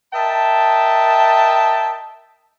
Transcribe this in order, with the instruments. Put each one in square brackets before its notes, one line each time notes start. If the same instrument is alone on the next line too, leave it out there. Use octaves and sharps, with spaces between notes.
[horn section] A#4 D#5 E5 G5 A5